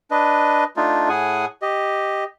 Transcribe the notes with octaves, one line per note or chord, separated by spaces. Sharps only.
D4 B4 D#5
A3 D4 D#4 F4
A2 G#4 F#5 G#5
G4 D#5